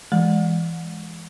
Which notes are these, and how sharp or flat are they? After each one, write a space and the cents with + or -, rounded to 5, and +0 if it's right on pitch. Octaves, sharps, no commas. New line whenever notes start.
E3 +20 G#3 +0